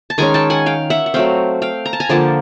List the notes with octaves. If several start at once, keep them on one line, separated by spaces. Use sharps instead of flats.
A5
D#3 G#3 C#4 G#5 A#5
G5 A5
F#5 G#5
F5 G5
E5 F#5
F#5
F#3 A3 C4 F5 G5
F5 G5
A#5
A5
G#5 A#5
D3 F3 A#3 G5 A5